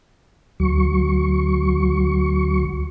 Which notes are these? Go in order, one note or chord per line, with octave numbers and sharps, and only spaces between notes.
D2 F#3 C#6